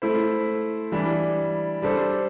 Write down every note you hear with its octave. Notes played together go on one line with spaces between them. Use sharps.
A3 E4 C5
E3 G3 D4
G3 D4 A4 C5